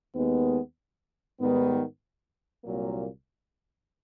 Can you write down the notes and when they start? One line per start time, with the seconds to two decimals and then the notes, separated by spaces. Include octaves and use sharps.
0.14 D#2 D#3 G#3 B3
1.39 G#2 D#3 G3 B3
2.63 C2 A#2 F#3 A#3